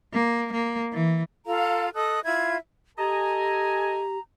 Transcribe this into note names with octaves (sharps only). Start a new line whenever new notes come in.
A#3
A#3
E3
F4 A4 F5 A#5
A4 D#5 D#6 F#6
E4 F4 E5 G#6
G4 A4 D#5 G#5 A#5